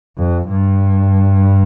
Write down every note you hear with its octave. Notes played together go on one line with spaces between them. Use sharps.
F2
G2